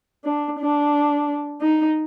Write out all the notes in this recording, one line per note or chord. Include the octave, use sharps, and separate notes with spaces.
D4
D4
D#4